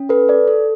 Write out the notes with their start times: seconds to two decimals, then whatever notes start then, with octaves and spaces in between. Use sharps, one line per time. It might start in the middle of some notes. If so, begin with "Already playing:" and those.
Already playing: C#4
0.09 A4 B4
0.28 A4 D5
0.48 A4